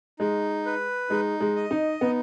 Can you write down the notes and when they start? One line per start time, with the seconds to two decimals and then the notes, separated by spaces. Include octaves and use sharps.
0.19 G#3 D#4
0.66 B4
1.10 G#3 D#4
1.41 G#3
1.56 D#5
1.71 D#4
2.01 B3 D#4